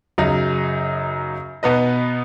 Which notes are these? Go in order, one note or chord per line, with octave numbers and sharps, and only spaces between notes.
F#2 C#3 F#3 D#4
B2 B3 D#4 B4 D#5